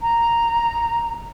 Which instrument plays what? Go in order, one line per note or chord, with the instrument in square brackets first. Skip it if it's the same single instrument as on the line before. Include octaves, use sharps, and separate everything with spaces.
[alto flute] A#5